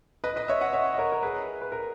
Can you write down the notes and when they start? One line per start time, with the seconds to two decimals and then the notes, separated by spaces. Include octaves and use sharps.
0.24 B4 D#5
0.36 B4 D#5
0.48 C#5 E5
0.61 D#5 F#5
0.73 C#5 E5
0.94 D#5
0.98 A#4 C#5
1.12 A#4
1.23 G#4 B4
1.62 B4
1.72 A#4